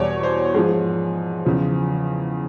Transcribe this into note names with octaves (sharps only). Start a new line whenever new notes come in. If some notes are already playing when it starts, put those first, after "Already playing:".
Already playing: E2 B2 G3 C#5 D5
C5
G#2 F3 G#4
E2 C#3 F3